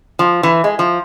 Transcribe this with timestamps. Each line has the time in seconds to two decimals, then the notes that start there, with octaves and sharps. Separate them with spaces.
0.19 F3
0.43 E3
0.64 G#3
0.79 F3